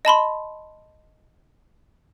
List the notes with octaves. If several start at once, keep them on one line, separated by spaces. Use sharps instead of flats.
D#5 A5 B5 C6